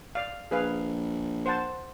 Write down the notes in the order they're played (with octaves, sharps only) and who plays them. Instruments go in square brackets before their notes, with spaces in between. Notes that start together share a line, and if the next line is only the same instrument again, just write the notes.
[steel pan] D5 F5
[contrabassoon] A#1 [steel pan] G#4 B4 F5
[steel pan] C5 F#5 A5